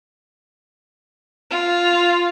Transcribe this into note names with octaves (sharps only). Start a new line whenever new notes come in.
F4